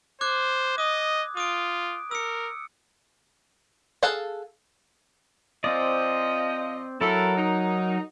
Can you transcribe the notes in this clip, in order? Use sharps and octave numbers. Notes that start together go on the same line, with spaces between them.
C5 D6 F#6 G#6
D#5 D#6
F4 D#6 D7
A#4 E6 C#7
G#4 A4 F5 F#5
F3 C4 D5 D#5
F#3 E4 A4 A#4
D#4